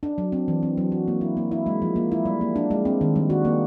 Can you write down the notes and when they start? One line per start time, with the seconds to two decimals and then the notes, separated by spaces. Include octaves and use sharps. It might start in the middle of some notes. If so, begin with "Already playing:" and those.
0.03 D4
0.18 F#3
0.32 C4
0.48 E3
0.63 C4
0.77 F#3
0.92 F#4
1.08 A#3
1.21 E4
1.37 A#3
1.51 E4
1.66 G#3
1.82 F3
1.96 A#3
2.12 E4
2.25 G3
2.41 A#3
2.56 D4
2.71 G#3
2.85 C4
3.01 D#3
3.16 G3
3.30 F#4
3.45 A#3